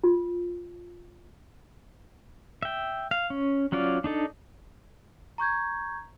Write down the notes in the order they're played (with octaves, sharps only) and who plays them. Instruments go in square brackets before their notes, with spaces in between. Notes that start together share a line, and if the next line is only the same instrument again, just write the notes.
[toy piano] F4
[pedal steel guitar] E5 G5
F5
C#4
F#3 C#4 F4 D5
D4 D#4 A4
[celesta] A#5 C#6 G6 G#6